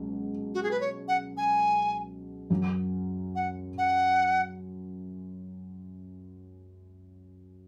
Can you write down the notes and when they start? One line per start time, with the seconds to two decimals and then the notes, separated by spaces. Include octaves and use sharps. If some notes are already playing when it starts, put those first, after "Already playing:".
Already playing: C#2 B2 F#3
0.54 F#4
0.63 G#4
0.71 B4
0.81 C#5
1.08 F#5
1.37 G#5
2.50 F#2 F#3 C#4 F#4
3.35 F#5
3.78 F#5